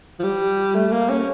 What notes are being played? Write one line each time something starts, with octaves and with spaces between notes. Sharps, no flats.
F3
G3
A3
A#3
C#4